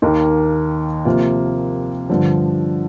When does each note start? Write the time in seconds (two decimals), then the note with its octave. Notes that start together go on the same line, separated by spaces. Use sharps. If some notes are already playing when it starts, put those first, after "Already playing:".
0.02 D#2 D#3 A#3 D#4 A#4
1.05 C3 F3 A#3 F4
2.09 G2 D3 F3